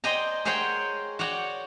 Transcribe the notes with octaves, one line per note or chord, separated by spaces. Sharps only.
C5 D5 D#5 G5 G#5 A#5
G#4 A#4 C5 C#5 F#5 G5
F#4 C#5 D5 F#5 G5